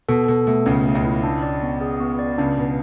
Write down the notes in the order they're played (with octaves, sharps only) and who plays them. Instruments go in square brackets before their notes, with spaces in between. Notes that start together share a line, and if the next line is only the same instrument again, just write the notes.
[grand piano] B2 [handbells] A4
[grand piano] B2 [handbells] A4
[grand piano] B2 [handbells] A3
[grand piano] C#2 C#3 [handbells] A3
[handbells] A3
[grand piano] C#2 C#3
[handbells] E4
D4
D5
B3
G#4
B3
D5
[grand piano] C#2 C#3 [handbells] D4
[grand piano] B2 [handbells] D4